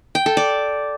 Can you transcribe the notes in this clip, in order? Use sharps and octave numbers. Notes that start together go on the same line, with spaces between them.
G5
A4
D5